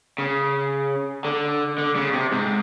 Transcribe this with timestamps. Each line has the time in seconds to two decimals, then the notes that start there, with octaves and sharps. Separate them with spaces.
0.18 C#3
1.25 D3
1.78 D3
1.96 C#3
2.13 C3
2.32 G#2